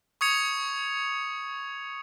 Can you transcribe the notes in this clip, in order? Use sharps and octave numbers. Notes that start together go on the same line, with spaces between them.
C#6 D#6 G#6 C#7 F7